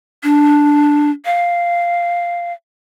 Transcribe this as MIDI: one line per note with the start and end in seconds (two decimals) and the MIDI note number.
0.23 1.10 62
1.25 2.53 77